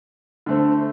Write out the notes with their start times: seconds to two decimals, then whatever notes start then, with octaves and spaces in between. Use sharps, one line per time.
0.46 D3 A3 C4